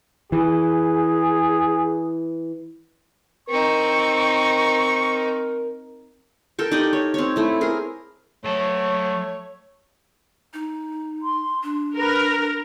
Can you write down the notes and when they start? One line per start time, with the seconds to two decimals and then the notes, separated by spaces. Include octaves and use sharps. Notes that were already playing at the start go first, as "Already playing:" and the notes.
0.32 E3 G#4
3.49 C4 D#4 A#4 C#6
6.59 A4 A#4 G5
6.71 D#4 G4 D5 D#5
6.93 C#5
7.14 C4 C#5
7.36 A3 E4
7.61 G#4 A#4
8.45 F#3 A3 C#5 A5
10.53 D#4
11.22 C6
11.63 D4
11.97 A#4 B4